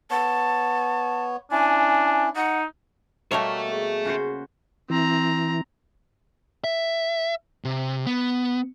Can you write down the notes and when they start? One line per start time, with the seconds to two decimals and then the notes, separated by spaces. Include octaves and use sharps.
0.11 B3 C#5 A5
1.51 C#4 D4 E4 G#5
2.36 D#4 F#5
3.31 B2 G3 A3 A#3 A4 A#4 C#5 E5
3.71 G#4
4.05 C#3 F#4 C5
4.90 E3 C4 A#5
6.64 E5
7.64 C3
8.06 B3